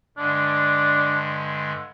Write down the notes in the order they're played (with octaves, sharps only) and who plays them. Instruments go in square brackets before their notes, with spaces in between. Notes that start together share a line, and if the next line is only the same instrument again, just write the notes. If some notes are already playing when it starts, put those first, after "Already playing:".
[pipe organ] G2 D3 G#3 [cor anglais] D4